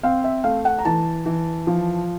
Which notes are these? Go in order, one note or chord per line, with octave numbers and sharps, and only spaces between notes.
C4 F5
E5
A3 F5
F#5
A#5
E3 A5
E3
F3